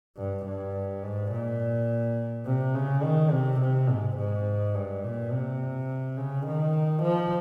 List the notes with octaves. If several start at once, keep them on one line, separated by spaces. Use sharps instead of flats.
G2
G2
G#2
A#2
C3
C#3
D#3
C3
C3
G#2
G#2
G2
A#2
C3
C#3
D#3
F3